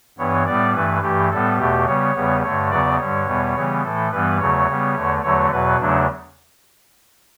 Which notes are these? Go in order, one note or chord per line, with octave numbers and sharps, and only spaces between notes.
G2 E3 B3 C#5
A2 G3 B3 D5
G2 E3 A3 B4
G2 E3 A3 G4
A2 G3 B3 A4
E2 B2 A3 G4
C#3 G3 B3 C#5
E2 C#3 G3 B3
G2 D3 A3 C#5
E2 C#3 F#3 B3 D5
G2 D3 G3 C#5
E2 B2 G3 B3
C#3 E3 G3 B3
A2 E3 A3 A4
G2 E3 G3 B3 B4
E2 C#3 F#3 A3 C#5
C#3 G3 B3
E2 D3 A3
E2 D3 F#3 A3 C#5
E2 B2 F#3 B4
E2 C#3 F#3 A3 D4